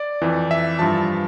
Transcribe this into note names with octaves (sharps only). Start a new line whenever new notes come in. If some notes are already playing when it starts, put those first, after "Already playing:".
Already playing: D5
F2 E3
E5
G2 F3 A5